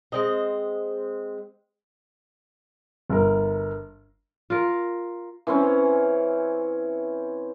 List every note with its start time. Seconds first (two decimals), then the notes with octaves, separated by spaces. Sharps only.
0.12 G#3 C4 D#5
3.10 G1 A#4
4.50 F4 A#4
5.47 E3 C4 C#4